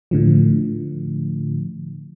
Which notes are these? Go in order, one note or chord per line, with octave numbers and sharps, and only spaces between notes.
A2 D3 F3